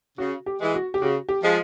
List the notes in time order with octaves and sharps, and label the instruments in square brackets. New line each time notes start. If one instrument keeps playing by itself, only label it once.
[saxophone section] C#3 [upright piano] F#4
[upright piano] G4
[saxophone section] E3 G#3
[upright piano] F#4
G4
[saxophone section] C#3 [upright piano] F#4
[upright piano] G4
[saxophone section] F3 G#3